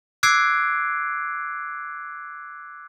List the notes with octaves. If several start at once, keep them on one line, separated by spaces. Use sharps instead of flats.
D6 E6 F#6 G#6 C7 D7